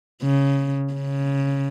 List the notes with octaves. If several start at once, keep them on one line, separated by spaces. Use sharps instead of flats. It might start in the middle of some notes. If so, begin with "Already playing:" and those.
C#3
C#3